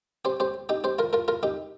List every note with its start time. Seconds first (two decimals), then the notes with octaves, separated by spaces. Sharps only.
0.25 G4 C5
0.40 G4 C5
0.69 D#4 G4
0.84 G4 C5
0.99 F4 A#4
1.13 F4 A#4
1.28 F4 A#4
1.43 D#4 G4